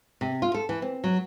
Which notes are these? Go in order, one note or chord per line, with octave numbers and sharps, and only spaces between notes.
C3
F4
A4
E3
C4
F#3